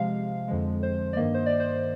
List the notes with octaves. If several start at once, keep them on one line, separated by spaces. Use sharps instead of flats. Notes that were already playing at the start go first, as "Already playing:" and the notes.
Already playing: C3 F3 G#3 F5
F2 D3 F3 G#3
C5
D5
G2 D#3 A#3 D#5
C5
D5
C5